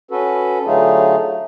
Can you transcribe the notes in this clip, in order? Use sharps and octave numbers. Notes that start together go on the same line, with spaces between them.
C#4 F#4 A4 B4
D3 F#3 A3 D#4 F4 G#4